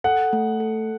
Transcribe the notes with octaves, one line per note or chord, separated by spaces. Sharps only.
A4 F#5
A3
A4